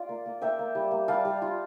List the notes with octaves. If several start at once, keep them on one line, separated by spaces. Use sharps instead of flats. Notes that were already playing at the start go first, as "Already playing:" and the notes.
Already playing: F4 D5 F5
A#3
A#3
A#3 E5 G5
A#3
G3
A#3
G3 F5 A5
G3
F4